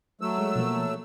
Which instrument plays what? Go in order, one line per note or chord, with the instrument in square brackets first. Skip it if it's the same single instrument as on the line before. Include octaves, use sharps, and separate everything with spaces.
[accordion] F#3 A3 E6
[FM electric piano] G#3
B2 F3 A#3